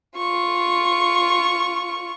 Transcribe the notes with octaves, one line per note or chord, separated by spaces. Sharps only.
F4 C#6